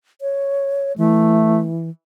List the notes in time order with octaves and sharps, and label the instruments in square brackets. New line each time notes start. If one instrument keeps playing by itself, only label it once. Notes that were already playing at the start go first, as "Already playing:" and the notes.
[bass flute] C#5
[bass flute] E3 [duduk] A3